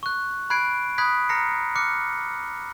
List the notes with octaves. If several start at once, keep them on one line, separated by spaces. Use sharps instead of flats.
C#6 F#6
B5 F#6 G#6 C7 D7
B5 D#6 F#6 G#6 B6
A#5 F6 A#6 C7 C#7
D6 F6 F#6 C#7